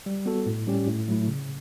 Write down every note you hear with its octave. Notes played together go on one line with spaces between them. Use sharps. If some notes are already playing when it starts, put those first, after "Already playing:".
G3
B3 F#4 A4
A2
G3 C#4 G4
A2
F#3 A3 E4
C#3